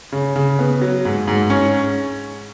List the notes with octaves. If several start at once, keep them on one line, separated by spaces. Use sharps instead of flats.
C#3
C#3
B3
F#3
G#2
G#2
C#4